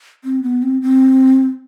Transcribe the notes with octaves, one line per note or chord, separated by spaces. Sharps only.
C4
B3
C4
C4